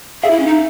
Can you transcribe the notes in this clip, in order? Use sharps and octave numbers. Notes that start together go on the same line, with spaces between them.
G#4 E5
E4
C#4
D#4